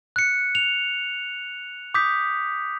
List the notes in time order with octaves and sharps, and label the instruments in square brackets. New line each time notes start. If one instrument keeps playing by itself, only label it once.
[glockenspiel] F#6 C#7
F7
D6 D#6 G6 B6